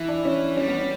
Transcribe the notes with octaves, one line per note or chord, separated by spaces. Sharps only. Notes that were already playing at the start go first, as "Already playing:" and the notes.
Already playing: E3 E4
D4
C#4
G3 C#4
B3
C#4